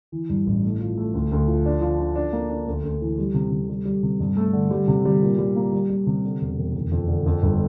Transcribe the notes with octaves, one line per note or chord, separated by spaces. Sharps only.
E3
G2
A1
A3
F3
A3
D2
D2
F3
D4
F3
D4
D4
A#3
D4
D2
D2
E3
G3
C3
C3
G3
G3
C3
G2
A3
D3
G3
C3
G3
A#2
G3
A#3
G3
G3
C3
D3
E1
E1
F1
F2
D3
F2
G1